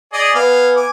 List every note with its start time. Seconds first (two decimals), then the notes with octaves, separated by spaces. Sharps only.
0.13 G#4 D5 D#5
0.35 B3 F5 G#5
0.76 G#5 D6